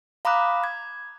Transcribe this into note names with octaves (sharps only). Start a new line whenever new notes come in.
F5 A#5 B5 D6 D#6 F#6
G#6